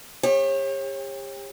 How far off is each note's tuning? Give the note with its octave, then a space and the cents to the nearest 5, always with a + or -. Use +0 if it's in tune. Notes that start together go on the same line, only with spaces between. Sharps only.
G4 +30 C#5 -30